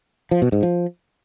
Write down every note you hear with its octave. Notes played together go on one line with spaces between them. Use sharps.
F3
B2
G#2
F3